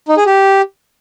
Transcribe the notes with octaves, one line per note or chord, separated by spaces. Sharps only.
D#4
G#4
G4